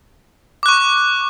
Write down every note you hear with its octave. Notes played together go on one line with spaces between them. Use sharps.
C#6 D6 F#6